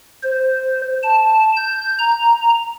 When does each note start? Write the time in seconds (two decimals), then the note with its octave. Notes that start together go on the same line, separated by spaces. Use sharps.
0.23 C5
1.03 A5
1.57 G6
1.99 A#5